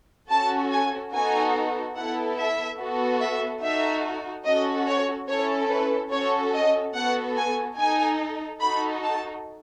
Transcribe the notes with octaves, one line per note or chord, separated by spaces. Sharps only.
C#4 F#4 A4 A5
G#5
B3 D#4 F#4 A4 G#5
B3 E4 A4 F#5
E5
B3 F#4 A4
E5
D#4 F#4 A4 E5
C#4 F#4 A4 D#5
C#5
C#4 E4 A4 C#5
B4
C#4 F#4 A4 C#5
D#5
B3 F#4 A4 F#5
G#5
D#4 A4 G#5
D#4 F#4 A4 B5
A5